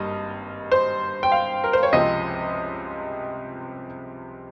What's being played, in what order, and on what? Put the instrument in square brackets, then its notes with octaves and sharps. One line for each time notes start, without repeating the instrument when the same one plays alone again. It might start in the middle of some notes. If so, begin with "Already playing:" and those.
Already playing: [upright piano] G#1 G2 G3 A#3 D#5
C5
G5
F5
A#4
C5
C#5
C#2 C3 F3 G#3 C4 D#5